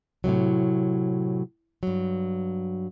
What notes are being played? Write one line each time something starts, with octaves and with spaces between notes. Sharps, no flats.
A2 C3 D#3 F#3
G2 F#3